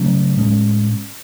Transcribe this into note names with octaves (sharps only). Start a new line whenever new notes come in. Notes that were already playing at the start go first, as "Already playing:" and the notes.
Already playing: C#3 F#3 A3 C#4
A2 G#3 C#4